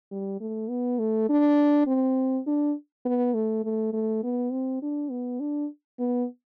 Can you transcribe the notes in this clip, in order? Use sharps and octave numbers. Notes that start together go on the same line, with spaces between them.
G3
A3
B3
A3
D4
C4
D4
B3
A3
A3
A3
B3
C4
D4
B3
D4
B3